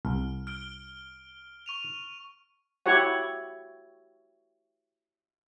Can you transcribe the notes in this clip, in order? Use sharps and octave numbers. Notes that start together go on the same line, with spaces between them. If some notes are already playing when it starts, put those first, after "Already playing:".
C2 F6
F6 D7 G7
C#6 D#7 F7
E4 F#4 G4 C#5 F#5